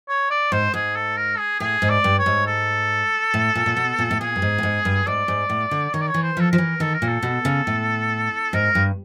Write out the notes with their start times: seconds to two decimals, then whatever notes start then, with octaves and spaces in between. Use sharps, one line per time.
0.08 C#5
0.31 D5
0.52 G#2 C5
0.74 G#2 G#4
0.96 A4
1.17 A#4
1.38 G#4
1.60 A2 G#4
1.82 G#2
1.90 D5
2.04 G2
2.19 C#5
2.26 G#2
2.47 A4
3.34 A2
3.55 A#2
3.66 A#2
3.77 B2
3.99 A#2
4.11 A2
4.20 A#2 G#4
4.36 G2
4.42 G#2
4.58 A2
4.63 G#2
4.85 G2
5.07 G#2 D5
5.28 G#2
5.50 A2
5.71 D3
5.94 D#3 C#5
6.01 D5
6.09 C#5
6.14 E3
6.23 C5
6.37 F3 A4
6.51 F3 A#4
6.58 E3
6.80 D#3 A4
6.93 A#4
7.02 A#2
7.07 A4
7.23 B2
7.45 C#3
7.67 A2
8.53 G#2 A#4
8.75 G2